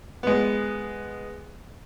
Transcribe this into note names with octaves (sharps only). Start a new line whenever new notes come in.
G#3 B3